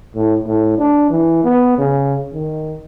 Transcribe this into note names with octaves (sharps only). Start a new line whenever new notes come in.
A2
A2
D4
E3
B3
C#3
D#3